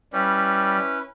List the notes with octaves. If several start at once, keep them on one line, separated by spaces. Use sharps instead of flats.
G3 C#4 E4 B4